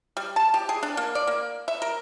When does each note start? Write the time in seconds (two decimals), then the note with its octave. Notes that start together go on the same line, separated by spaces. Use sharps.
0.17 G3
0.36 A5
0.54 G4
0.69 G#4
0.83 D4
0.97 A#3
1.15 D5
1.27 A#3
1.68 E5
1.82 A#4